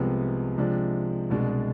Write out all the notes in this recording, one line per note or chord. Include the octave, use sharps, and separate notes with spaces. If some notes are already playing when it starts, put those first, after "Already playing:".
Already playing: C2 C3 F3 G#3 B3
C3 F3 G#3 D4
C2 B2 G#3 D4